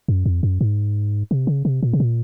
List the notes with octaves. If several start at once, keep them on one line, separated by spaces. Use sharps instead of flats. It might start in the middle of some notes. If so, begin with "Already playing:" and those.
F#2
F2
F#2
G#2
C3
C#3
C3
A#2
C3
A#2